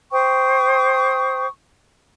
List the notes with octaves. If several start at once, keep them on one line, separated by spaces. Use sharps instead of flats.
C5 G5 C#6 D#6